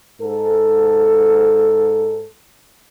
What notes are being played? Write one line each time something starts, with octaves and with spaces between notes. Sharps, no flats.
G#2 A4